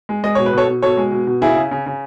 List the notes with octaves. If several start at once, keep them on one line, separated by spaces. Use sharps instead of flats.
G#3
G#3 D#5
B2 C#5
B4
B2 A4 C#5
B2
B2 A4 C#5
G#3
B2
B2
C#3 E4 G#4
C#3
C#3
C#3